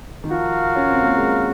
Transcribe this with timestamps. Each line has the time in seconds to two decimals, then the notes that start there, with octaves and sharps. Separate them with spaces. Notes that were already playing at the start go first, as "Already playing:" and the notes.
0.24 D#3
0.29 F3 F#4 A#4 F5
0.76 C#4
0.89 C4
1.02 A#3
1.17 G#3